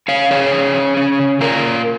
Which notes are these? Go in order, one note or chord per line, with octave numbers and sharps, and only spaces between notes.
C#4 C#5 F5
F3 G#4 C#5
C#4
C#4
C#4
C#3
C#4 F4 A#4
A#2